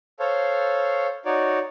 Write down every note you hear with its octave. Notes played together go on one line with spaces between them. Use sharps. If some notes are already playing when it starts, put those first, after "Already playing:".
A4 C5 C#5 F5
D#4 F#4 C#5 D5